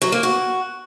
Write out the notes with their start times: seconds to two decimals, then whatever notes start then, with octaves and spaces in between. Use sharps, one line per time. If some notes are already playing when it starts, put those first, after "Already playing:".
0.02 F#3
0.12 A#3
0.23 F#4